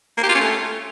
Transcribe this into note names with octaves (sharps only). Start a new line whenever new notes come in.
A#3
G4
F4
C#4
A3